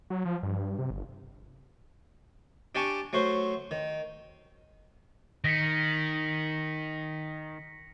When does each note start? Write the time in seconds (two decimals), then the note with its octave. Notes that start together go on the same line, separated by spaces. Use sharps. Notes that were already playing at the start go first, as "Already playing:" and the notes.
0.10 F#3
0.25 F3
0.43 G2
0.79 C3
0.90 G1
2.75 D4 G4 D5 G#5 A5 C#6
3.13 F#3 A3 F#4 C5
3.71 D#3
5.44 D#3 A#6 B6 C#7